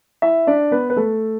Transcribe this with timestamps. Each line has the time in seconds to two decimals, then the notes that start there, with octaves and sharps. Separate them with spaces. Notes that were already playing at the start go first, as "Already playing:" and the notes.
0.22 E4 E5
0.47 D4 D5
0.71 B3 B4
0.90 B4
0.96 A3 A4